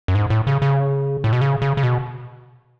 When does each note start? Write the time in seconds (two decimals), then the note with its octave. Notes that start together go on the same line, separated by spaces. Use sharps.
0.08 F#2
0.15 G#2
0.30 A2
0.47 C#3
0.62 C#3
1.24 A2
1.33 B2
1.41 C#3
1.62 C#3
1.77 C#3
1.83 B2